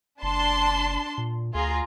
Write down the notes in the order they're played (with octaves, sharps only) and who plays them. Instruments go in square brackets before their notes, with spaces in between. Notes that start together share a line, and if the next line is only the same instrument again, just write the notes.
[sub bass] F#1 [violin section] D4 A5 C6
[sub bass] A#2
[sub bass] D2 [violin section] F4 G#4 A#5